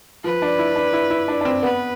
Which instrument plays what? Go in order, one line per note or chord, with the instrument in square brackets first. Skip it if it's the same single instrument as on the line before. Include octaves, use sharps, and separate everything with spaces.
[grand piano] F3 [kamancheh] B4
[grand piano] D4
E4
D4
E4
E4
D4
D4
C4
[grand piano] B3 [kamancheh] B4